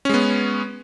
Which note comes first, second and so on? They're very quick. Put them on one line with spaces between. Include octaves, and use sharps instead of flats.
C#4 G#3 B3